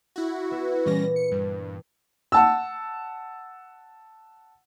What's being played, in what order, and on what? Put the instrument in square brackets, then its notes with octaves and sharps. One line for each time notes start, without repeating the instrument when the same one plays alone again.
[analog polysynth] E4 F#4
[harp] B3 E5 C#6
[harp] A#2 E3 B3 [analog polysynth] G3 C#4 A#6
[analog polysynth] C#7
G2
[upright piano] F#5 A5 E6